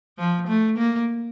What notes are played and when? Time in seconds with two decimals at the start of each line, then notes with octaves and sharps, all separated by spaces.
0.18 F3
0.48 A3
0.78 A#3